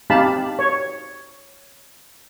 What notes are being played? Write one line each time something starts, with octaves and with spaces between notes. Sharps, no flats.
C4 D#4 G4 F5 A5 B5
C#5